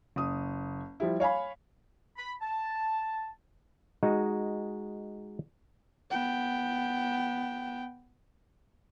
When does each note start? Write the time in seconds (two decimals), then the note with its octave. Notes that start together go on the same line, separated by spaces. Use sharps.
0.16 F#1 D#6
1.00 F3 G3 E4
1.20 C#5 F5 G#5 B5
2.17 B5
2.41 A5
4.03 G#3 D#4 F#4
6.10 B3 G5